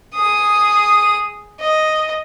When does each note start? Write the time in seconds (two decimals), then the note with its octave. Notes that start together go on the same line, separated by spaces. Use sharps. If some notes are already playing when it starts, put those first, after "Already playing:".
0.15 G#4 D#6
1.61 D#5